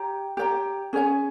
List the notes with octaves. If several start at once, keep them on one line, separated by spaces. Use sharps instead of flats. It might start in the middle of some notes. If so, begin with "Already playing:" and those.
Already playing: G4 C#5 G5 A#5
G4 C#5 G5 A#5
C#4 G#4 C#5 G#5